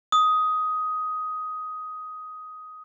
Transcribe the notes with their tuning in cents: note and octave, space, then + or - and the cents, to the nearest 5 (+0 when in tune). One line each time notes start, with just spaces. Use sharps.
D#6 +10